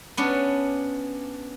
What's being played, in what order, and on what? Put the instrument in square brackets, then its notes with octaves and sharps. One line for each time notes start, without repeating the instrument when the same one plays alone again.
[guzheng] B3 C#4 D4